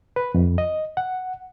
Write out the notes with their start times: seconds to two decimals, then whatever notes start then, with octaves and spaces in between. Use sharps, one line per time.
0.16 B4
0.34 F2
0.58 D#5
0.97 F#5